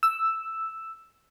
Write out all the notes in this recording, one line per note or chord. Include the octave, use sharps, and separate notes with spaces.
E6